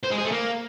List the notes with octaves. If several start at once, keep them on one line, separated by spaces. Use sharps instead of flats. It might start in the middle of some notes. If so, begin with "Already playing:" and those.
C5
G#3
G#4
A3
A#3